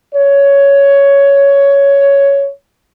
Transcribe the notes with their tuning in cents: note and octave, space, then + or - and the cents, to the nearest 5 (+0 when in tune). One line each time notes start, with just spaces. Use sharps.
C#5 +10